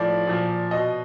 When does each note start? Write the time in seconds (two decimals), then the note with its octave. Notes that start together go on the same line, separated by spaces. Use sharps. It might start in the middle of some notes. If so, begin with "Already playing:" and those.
Already playing: A2 F3 D5
0.27 A#2 F3
0.71 B2 D#5